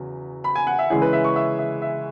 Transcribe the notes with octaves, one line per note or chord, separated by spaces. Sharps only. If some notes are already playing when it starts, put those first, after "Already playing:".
Already playing: E2 C#3 F#3
B5
G#5
F#5
E5
C#3 E3 G#3 C#4 E4 G#4
B4
E5
C#6
E5
E5
E5